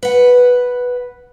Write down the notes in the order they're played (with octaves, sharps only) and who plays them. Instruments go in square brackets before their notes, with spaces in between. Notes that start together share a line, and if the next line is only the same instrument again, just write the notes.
[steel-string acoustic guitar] B4 F#5